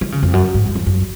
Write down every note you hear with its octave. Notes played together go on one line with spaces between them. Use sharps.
D#3
C#3
F2
F#2
G#2
F#2
F2
F#2